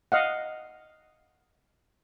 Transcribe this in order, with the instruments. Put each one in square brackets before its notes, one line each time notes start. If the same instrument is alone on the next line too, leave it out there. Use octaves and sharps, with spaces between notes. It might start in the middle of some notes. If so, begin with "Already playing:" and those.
[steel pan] D#5 F5 F#5